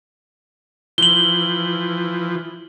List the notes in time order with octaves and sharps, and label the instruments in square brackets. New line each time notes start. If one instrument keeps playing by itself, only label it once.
[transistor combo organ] E3 F3 [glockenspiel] F#7 G7